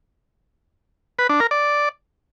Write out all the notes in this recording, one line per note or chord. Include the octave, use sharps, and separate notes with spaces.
B4
D4
A#4
D5